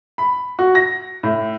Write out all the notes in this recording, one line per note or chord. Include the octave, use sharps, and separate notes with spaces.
B5
F#4
A#6
A2